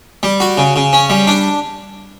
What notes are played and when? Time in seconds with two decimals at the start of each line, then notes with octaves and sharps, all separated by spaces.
0.23 G3
0.40 F#4
0.58 C#3
0.76 C#3
0.93 C#4
1.10 G3
1.27 D4